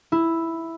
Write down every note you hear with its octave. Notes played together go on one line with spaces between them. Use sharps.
E4